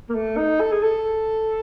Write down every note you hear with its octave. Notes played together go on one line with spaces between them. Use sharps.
A#3
A3
D#4
A4
G#4
A4